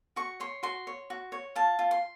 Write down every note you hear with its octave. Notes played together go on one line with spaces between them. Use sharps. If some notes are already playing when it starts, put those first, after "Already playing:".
F#4 C#6
C#5 C6
F#4 C6
C#5
F#4
C#5
F4 A5
F4
C6